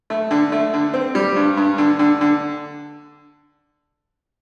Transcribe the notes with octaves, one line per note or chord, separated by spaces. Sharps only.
A3
D3
A3
D3
C4
G3
G2
G2
D3
D3
D3